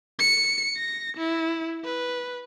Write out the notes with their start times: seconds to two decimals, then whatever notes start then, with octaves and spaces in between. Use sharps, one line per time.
0.19 C#7
0.76 A#6
1.17 E4
1.84 B4